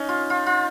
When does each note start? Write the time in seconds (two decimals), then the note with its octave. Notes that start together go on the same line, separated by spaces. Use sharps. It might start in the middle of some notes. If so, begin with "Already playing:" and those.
Already playing: C#4 D#4
0.09 F4
0.30 F4
0.46 F4